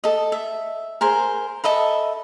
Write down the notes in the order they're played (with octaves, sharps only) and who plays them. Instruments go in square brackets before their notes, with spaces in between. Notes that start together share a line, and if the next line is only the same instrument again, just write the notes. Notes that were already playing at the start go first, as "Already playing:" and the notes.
[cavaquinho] A4 D#5
E5
G#4 A#4 C5
A4 D#5 E5 B5